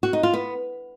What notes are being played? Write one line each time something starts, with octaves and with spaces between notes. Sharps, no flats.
F#4
D#4
F4
B3